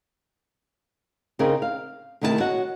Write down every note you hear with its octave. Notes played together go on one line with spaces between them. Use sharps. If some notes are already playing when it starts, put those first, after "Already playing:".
C#3 C4 D#4 G#4 A#4
F5
D2 C3 D#3 E4 A4 A5
F#4 C#5 D#5 F#5